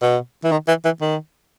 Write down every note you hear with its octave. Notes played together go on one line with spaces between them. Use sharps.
B2
E3
D#3
E3
E3
D#3